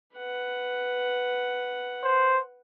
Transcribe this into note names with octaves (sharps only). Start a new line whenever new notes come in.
B4 F#5
C5